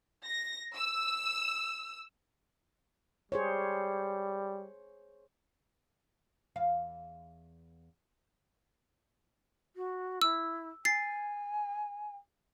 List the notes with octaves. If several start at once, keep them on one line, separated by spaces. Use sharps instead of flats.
A#6
E6
G3 G#4 C5 C#5
E2 F5
F#4
E4 E6
G#5 A6 C7